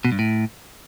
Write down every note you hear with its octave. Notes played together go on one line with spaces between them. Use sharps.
B2
G2
A2